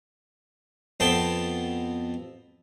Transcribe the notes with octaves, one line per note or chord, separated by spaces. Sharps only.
F2 B3 G5 A5 C6